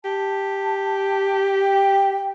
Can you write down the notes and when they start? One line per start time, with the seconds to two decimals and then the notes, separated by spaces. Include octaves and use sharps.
0.04 G4 A5
1.58 G5